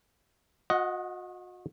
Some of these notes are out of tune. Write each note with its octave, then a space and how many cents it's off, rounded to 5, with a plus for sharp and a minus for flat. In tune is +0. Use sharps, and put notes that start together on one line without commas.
F#4 -40 D#5 +5 F#5 +0